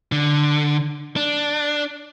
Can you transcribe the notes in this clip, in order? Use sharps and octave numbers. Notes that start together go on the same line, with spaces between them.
D3
D4